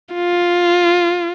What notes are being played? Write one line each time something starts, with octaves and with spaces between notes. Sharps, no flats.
F4